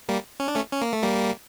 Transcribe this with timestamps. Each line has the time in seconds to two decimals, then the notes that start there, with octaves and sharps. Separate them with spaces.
0.08 G3 A#3
0.40 C#4
0.48 D4
0.56 A3 C#4
0.72 C#4
0.82 A#3
0.93 A3
1.03 G3 A#3